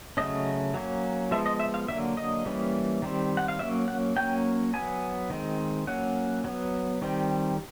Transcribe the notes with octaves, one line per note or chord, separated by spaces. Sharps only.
C#3 F#3 A3 C#4 D#5
F#3 A#3 C#4
F3 G#3 B3 E5
D#5
E5
F5
D3 F#3 A#3 E5
D#5
E3 G3 A#3 C#4
D#3 G3 C4
F#5
F5
F#3 A#3 C#4 E5
F#5
F#3 A#3 C#4 G5
F#3 B3 G#5
D#3 G#3 C4
F#3 A#3 C#4 F#5
F#3 B3
D#3 G3 C4